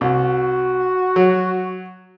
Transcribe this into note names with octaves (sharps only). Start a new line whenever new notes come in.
C2 F#4
F#3